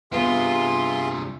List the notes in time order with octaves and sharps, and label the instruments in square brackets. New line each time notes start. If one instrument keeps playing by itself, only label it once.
[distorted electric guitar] G2 C3 [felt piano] B3 [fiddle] F4 [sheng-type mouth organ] G#4 E5 C6